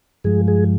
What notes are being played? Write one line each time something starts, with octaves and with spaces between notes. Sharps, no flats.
G2 F3 G#3 G#4
G#4